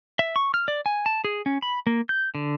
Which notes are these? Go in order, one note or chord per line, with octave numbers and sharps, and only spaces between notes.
E5
C#6
F6
D5
G#5
A5
G#4
C#4
B5
A#3
G6
D3